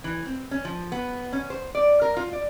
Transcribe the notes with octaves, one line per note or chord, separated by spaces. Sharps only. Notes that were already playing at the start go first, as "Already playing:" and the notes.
E3
C4
C#4
F3
B3
C#4
C5
D5
A#4
F4
D5